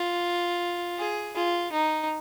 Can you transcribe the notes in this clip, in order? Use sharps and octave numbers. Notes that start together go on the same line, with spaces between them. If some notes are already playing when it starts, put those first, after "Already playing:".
Already playing: F4
G#4
F4
D#4